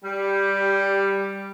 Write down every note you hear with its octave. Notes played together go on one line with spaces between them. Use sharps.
G3